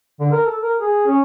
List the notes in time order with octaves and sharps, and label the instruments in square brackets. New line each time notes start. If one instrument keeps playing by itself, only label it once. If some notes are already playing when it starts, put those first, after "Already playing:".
[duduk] D3
A#4
A4
A#4
G#4
C#4